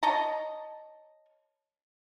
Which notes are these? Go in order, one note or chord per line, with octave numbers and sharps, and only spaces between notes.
C#5 D#5 A5 A#5